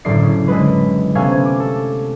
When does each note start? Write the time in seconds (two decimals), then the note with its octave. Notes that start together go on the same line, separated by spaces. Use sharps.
0.05 F#1 A2 D3 D5 C7
0.23 C#3
0.48 D3 G#3 B4
1.15 C3 A3 B3 C#4 F5 G#5
1.45 D6
1.60 A4